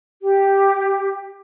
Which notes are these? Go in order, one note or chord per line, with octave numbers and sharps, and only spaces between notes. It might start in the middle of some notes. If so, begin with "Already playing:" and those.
G4